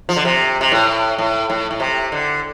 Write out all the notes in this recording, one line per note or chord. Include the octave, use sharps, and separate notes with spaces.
F3
D3
C3
C3
A2
A2
A2
A2
C3
D3